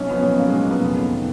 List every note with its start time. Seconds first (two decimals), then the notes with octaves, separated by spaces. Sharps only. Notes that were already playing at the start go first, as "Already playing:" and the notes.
Already playing: B1 C#4
0.08 F3 B3
0.15 C#4
0.23 B1
0.37 A#2 A#3
0.48 B1 G#3
0.67 F3 B3
0.82 F1
0.97 D#3